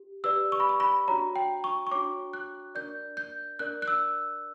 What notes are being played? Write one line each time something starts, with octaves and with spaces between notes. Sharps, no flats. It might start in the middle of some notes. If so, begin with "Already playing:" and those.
Already playing: G4
G4 B4 D5 E6
C#6
B5
C#6
B5
D4 F#4 C#5 A#5
G5
C#6
C#6
D4 F#4 C#5 D6
F#6
D4 A#4 D5 G6
G6
D4 A#4 D5 F#6
F#6
E6